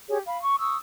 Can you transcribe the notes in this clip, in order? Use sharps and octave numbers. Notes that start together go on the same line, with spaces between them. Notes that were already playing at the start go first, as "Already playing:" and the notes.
G4 G#4 C#5
F5 B5
C#6
C#6 D#6 E6